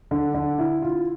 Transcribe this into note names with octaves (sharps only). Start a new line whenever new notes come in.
D3
D3
E4
F4